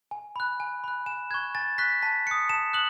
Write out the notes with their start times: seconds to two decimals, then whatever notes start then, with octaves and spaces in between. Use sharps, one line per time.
0.11 G#5
0.36 B5 F#6
0.60 G#5
0.84 B5 F#6
1.06 G#5 E7
1.31 C#6 F#6 G#6
1.55 G#5 A6
1.78 C#6 F#6 B6
2.02 A5 B6
2.26 D#6 F#6 C#7
2.49 A5 E7
2.73 D#6 F#6 F#7